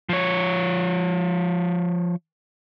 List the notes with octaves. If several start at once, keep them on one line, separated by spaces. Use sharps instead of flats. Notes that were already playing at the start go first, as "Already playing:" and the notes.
F3 C#5